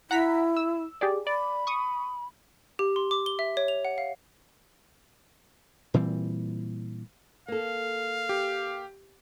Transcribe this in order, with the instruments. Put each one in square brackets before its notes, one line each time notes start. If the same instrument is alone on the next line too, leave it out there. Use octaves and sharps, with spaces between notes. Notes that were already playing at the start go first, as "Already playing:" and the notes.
[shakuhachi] E4 [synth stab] F#5 A#5 B6
[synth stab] E6
G4 G#4 D5
[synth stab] D5 [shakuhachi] B5
[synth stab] C#6 D#6
[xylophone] G4
C6
D6
G7
E5
C#5
F7
F#5
F5
[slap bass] A#2 E3 G3 C4
[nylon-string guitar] A#3 A4 [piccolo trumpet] F5
[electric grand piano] G4